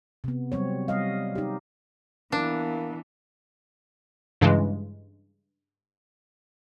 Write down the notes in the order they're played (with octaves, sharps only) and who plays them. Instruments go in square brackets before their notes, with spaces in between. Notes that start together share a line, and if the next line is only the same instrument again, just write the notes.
[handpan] C3 B3
F#3 G3 C4 C#5
G3 D#5 F5
D#4 G4
[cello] E3 B3 [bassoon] A#3 [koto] D4
[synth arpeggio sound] G2 C#3 E3 G#3